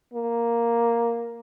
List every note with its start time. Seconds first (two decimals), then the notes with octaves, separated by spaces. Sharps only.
0.14 A#3